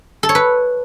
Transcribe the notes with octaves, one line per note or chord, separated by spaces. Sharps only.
A4
C#5
B4